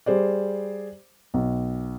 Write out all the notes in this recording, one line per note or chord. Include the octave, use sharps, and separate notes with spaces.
G3 G#4 C5 D5
B1